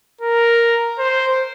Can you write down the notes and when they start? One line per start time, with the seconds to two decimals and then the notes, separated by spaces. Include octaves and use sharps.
0.21 A#4
0.99 C5